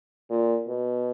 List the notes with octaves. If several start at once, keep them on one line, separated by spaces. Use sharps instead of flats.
A#2
B2